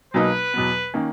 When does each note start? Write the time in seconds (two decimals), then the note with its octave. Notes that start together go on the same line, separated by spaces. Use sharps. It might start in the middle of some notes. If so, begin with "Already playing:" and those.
0.14 B1 B2 F#3 A#3 D#4 B4
0.54 E2 B2 F#3 B3
0.94 D#3 A#3 C#4